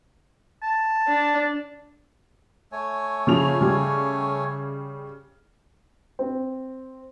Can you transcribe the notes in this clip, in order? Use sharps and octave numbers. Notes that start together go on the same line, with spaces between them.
A5
D4
A3 C#5 G#5
C#3 F3 F7
C#3 G3
C4